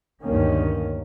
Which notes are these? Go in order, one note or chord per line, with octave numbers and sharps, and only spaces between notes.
D2 G2 A#2 D#3 A#3 C#4